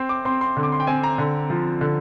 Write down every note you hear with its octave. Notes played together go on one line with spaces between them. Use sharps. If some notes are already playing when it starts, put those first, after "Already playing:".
Already playing: C4 C6
D6
C4 C6
C6
D3
D6
C6
G5
C4 G#5
A#5
D3
F3
D3